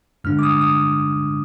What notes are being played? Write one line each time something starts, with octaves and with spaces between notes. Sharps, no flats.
G2 D3 G#3 D4 F6
D6
D#6
D#6